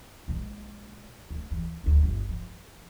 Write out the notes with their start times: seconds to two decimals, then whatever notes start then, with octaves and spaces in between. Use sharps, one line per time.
0.28 A#1 G#3
1.30 D2
1.51 E3
1.84 D2 F#3
2.03 G1
2.29 F3